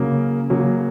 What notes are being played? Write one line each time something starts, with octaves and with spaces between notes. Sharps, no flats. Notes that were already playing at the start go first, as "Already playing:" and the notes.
Already playing: C#3 F#3 A#3
C#3 F#3 A#3